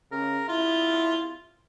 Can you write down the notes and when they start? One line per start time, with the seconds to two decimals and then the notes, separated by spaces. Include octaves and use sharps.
0.12 C#3 A#4
0.48 E4 F4